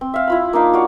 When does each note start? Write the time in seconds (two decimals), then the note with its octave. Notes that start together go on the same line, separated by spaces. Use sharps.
0.01 C4
0.14 E5 F5
0.27 E4 F4 B5
0.53 A#3 D4 D#4 F5
0.73 F#4 C#5 D5 F5